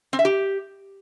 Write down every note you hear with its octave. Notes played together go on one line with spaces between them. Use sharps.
C4
E5
G4